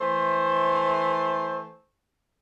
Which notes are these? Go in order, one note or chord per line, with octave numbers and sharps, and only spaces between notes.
E3 A3 C5